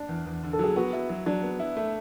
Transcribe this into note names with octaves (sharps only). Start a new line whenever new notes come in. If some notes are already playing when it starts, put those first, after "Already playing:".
Already playing: D4
E2
E2
D3
A4
F#3 G#4
B3 F#4
E4
F#3
F#3 D4
B3
E4
A3